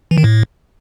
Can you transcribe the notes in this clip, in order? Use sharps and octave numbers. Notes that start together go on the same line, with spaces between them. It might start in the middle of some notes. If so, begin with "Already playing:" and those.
E3
D#3
A2